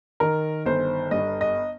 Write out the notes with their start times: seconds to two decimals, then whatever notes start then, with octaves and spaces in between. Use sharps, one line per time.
0.20 D#3 A#4
0.66 G1 C5
1.11 G2 D#5
1.41 D#5